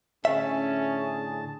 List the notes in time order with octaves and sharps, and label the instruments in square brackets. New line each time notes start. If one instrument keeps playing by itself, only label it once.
[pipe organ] A2 D3 A5 [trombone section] C#4 [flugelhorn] G#4 [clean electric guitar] E5